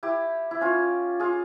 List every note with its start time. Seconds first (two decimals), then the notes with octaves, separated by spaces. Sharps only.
0.03 E4 G4
0.51 E4
0.61 C#4 F4
1.20 F4 G#4